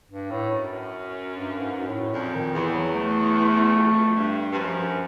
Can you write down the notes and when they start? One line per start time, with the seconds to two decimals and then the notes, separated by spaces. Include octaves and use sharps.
0.11 G2
0.31 A2
0.52 F#2
1.33 G2
1.59 G#2
1.87 A2
2.14 F2 A#2
2.34 D#3
2.54 E2 E3
2.75 F#3
2.95 A3
3.76 F2
3.84 E2
3.91 F2
4.16 G2
4.52 G2
4.57 F#2 F3